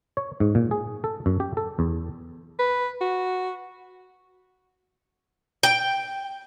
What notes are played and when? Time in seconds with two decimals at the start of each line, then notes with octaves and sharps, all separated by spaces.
0.17 C#5
0.40 G#2
0.55 A#2
0.71 G#4
1.04 A4
1.26 F#2
1.40 G4
1.57 A4
1.79 E2
2.59 B4
3.01 F#4
5.63 G5